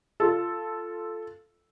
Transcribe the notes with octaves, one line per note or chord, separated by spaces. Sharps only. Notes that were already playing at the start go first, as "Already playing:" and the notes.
F4 A4